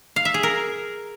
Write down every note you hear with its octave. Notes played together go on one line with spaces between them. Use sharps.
F5
E5
G#4
A#4